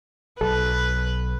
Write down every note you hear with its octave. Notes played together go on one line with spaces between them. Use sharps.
B1 A4 B4